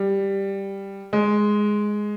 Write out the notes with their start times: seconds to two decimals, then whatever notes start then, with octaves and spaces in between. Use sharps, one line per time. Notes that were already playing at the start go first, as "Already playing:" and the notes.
Already playing: G3
1.13 G#3